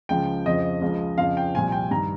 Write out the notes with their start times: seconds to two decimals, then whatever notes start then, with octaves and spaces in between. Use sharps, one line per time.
0.09 C#2 C#3 F3 G5
0.46 F2 C#3 F3 D#5
0.81 C#2 C#3 F3
1.18 F2 C#3 F3 F5
1.37 G5
1.54 C2 A#2 F3 G#5
1.72 G5
1.91 G2 D#3 A#5